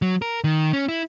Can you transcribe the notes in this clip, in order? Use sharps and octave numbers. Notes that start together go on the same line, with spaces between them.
F#3
A#4
D#3
C#4
E4